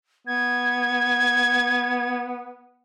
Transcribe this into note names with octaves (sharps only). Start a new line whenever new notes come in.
B3 G#6